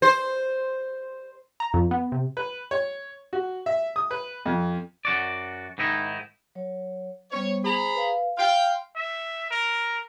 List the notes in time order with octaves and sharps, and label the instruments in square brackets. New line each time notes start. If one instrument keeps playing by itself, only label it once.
[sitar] C5
[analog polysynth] A#5
F2
B3
C3
[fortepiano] B4
C#5
F#4
E5
D#6
B4
F2
[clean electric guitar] F#2 F#4 D5
G#2 D#3 D#4 E4
[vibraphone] F#3 C#5
[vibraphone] G3 B3 C5 [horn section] C#5
[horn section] G#4 A#5 B5 [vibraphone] C5
[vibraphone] B4 F5
[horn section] F5 G5 [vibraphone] C6
[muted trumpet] E5
A#4